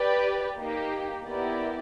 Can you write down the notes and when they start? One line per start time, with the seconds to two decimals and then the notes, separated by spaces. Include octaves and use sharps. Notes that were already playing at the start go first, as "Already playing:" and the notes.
Already playing: G4 B4 D5
0.57 A#3 D#4 G4
1.25 B3 E4 G4 A#4 D5